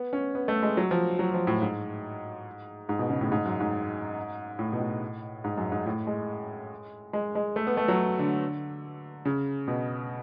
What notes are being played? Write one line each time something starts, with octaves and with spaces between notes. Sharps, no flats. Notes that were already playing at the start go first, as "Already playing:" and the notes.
Already playing: B3
C#4
B3
A3
G#3
F#3
F3
F#3
F3
A2
G#2
G#2
B2
C#3
A2
G#2
F#2
G#2
A2
B2
A2
G#2
F#2
G#2
A2
G#3
G#3
G#3
A3
B3
A3
F#3
D3
C#3
B2